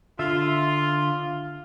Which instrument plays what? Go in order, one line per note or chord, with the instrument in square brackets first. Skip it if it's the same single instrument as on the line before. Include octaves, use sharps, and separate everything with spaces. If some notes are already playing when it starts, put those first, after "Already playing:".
[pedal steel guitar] D3 E5 [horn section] F4